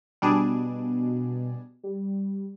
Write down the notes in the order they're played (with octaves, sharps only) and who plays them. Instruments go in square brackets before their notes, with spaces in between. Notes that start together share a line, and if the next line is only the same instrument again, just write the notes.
[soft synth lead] B2 [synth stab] G3 D4 G#4
[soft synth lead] G3